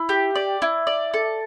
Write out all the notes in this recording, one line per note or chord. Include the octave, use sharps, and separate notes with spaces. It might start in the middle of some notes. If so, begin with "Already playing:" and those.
Already playing: E4
G4
D5
E4
D5
A4